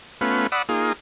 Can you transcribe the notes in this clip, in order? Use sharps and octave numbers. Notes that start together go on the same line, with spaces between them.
A3 B3 C#4 F4 B4
D5 F#5 B5 D#6 E6
A#3 D#4 F4 G#4